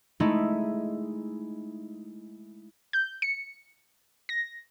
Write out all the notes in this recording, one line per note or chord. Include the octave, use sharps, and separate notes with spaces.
G#3 A3 D#4 E4
G6
C#7
A#6